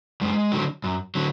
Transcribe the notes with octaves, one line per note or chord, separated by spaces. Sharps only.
F#2 G#3
D3 F#3
F#2
D3 F#3